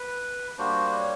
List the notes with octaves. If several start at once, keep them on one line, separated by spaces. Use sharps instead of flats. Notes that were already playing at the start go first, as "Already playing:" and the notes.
Already playing: B4
G3 A#3 D4 F#4 C5
C#5